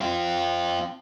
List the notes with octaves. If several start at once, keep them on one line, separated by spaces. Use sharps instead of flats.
C4 F4